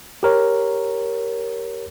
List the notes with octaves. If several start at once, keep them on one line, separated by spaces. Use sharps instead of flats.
G4 A#4 C#5